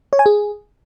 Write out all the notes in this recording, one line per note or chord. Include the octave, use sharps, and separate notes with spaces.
C#5
G#5
G#4